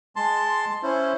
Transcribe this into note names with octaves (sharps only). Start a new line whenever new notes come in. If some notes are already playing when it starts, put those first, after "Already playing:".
G#3 A5 C6
C#4 E4 C5